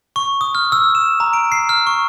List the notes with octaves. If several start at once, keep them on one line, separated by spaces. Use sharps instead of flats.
C#6
D#6
F6
E6
E7
A#5
D7
C7
F6
C#6